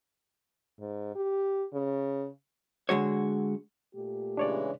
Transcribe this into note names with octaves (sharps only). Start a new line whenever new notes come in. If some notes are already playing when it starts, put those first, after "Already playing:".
G#2
G4
C#3
D3 G#3 F#4 C#5
A#2 A3 G4
C#3 E3 G#3 D4 C#5 D5